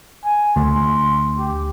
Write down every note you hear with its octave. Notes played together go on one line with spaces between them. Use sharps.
G#5
D2 C6
G4